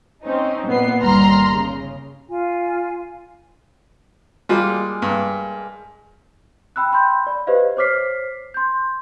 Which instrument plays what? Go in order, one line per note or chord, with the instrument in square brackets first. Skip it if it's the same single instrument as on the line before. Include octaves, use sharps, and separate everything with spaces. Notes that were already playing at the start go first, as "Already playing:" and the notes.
[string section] C4 C#4 D#4
A#2 B3 C7
G1 D#2 G3 A#5 C6 F6
C#3
[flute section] F4 G#5
[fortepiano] G3 F4 [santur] G#3 A#3
[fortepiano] G2
[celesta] G5 B5 E6 F#6
G5 B5 C6 G6
D5 B5
G4 B4 C5 D#5 F5
C5 C#5 D6 F6 B6 C7
C6 G6